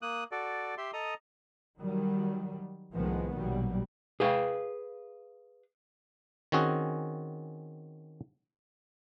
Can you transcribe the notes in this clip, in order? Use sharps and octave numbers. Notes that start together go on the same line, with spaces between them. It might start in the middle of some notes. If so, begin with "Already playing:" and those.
A#3 D#6 F#6
F#4 A4 D5
G4 E5 C6
A4 D#5 A#5 D#6
D#3 F#3 G3
C2 A2 D#3 F3 G#3 B3
A#1 B2 F#3 G3
G#4 B4 F5
D#3 C4 C#4 F#4 G#4